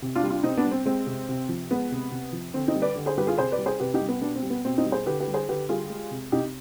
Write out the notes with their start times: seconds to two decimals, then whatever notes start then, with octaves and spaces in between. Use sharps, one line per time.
0.02 C3
0.15 D4 F4
0.23 G3
0.30 D4 F4
0.43 C3 C4 D#4
0.57 B3 D4
0.65 G3
0.72 C4
0.86 G#3 C4
1.07 C3
1.29 C3
1.49 F3
1.71 G#3 B3
1.92 C3
2.12 C3
2.33 F3
2.54 D3 C4
2.68 C4 D#4
2.75 G3
2.82 B4 D5
2.96 D3
3.06 G#4 C5
3.18 G3 G4 B4
3.27 F4 G#4
3.38 C3 G#4 C5
3.52 B4 D5
3.59 G3
3.66 G#4 C5
3.80 C3 G4 B4
3.94 D#4 G4
4.01 G3
4.09 B3
4.22 B2 B3 D4
4.36 C4
4.43 G3
4.50 B3
4.65 B2 C4
4.78 C4 D#4
4.85 G3
4.92 G#4 C5
5.06 D3 G4 B4
5.20 G4 B4
5.28 G3
5.34 G#4 C5
5.48 D3 G4 B4
5.69 G3 F4 G#4
5.90 G#3
6.11 C3
6.32 C3 D#4 G4